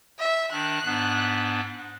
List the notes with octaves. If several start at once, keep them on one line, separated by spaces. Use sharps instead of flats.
E5
D#3 D4 F#6
G#2 B3 D4